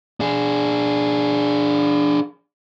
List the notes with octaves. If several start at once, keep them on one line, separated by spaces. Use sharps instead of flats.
D4 G#4